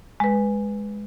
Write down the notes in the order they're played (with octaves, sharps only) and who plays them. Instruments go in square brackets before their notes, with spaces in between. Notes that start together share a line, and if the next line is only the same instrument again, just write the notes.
[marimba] G#3 B4